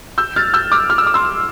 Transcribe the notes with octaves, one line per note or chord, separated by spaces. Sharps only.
E6 G6
F6 A6
E6 G6
D6 F6
F6
E6
D6
C6 E6